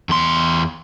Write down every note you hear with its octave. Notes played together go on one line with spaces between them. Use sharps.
E2 C6